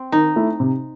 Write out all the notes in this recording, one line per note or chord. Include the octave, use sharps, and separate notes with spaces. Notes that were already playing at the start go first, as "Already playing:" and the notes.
Already playing: C4
D#3 D#4
A3 E4
C3